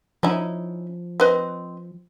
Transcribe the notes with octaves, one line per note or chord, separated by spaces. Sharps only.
F3 C#4 D#4 E4
C4 B4 D#5